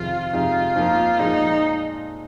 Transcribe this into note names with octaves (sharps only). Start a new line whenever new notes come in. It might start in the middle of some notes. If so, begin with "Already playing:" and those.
Already playing: F2 C3 D#3 C4 F4 G#4
F2 C3 F3 G#3 D#4 F4
F2 F3 A#3 D#4
A#2 F3 G#3 D#4